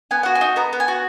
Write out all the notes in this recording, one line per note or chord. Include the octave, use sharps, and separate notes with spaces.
B3 G#5
F#4 F#5
G#5
D#4
B3 A#5
B3
G#5
F#4